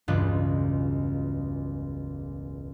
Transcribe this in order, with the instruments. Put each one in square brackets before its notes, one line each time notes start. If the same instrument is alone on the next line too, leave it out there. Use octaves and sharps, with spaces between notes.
[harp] E1 C#2 G2 F4 B4 F#6